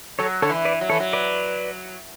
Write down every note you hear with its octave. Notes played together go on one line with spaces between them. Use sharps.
F#3 A4 C#5
D3 A4 C#5
E3
B4 D5
F#3
E3 A4 C#5
F#3
B4 D5